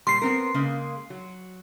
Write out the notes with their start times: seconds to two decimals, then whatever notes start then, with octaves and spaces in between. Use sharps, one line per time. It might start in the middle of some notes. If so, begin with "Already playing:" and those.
0.07 A#2 G3 C6 C7
0.22 B3 C4 A#4
0.54 C#3 G#3 A#3
1.10 F#3